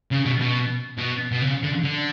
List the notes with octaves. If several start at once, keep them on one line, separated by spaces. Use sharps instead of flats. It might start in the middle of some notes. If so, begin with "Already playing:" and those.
C#3
B2
B2
B2
B2
C#3
D3
D3